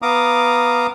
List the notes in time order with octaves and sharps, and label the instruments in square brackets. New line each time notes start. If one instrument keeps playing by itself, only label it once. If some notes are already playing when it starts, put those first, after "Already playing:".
[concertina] B3 F5 A#5 D6 D#6